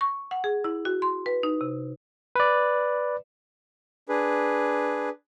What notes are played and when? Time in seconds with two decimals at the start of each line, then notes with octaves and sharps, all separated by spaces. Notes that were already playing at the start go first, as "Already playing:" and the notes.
0.01 C#6
0.31 F#5
0.44 G#4
0.64 E4
0.85 F#4
1.02 C6
1.26 B4
1.43 D#4
1.61 C3
2.36 B4 D5
4.09 D4 G#4 B4